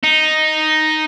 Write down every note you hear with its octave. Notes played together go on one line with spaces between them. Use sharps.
D#4